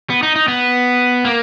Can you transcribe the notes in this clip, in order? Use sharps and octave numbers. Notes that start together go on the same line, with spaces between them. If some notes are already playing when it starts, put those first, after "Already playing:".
B3
D#4
D#4
B3
A#3